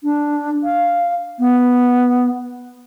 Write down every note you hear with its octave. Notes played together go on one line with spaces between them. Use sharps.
D4
F5
B3